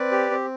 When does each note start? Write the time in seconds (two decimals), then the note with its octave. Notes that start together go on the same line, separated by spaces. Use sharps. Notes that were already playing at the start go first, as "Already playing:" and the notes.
Already playing: C4 B4 D5
0.11 G4
0.31 C4